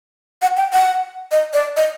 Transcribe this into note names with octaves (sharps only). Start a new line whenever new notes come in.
F#5
G5
F#5
D#5
D5
D#5